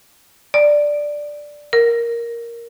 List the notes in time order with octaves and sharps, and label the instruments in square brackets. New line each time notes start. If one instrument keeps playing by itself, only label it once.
[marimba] D5
A#4